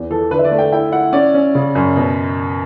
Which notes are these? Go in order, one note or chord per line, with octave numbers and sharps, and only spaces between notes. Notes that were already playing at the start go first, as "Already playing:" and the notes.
Already playing: E2
E3 A4
D3 B4
E5
D5
A3
G5
E4 G5
E4 F#5
C#4 D5
C#4
C#3
F#2
B2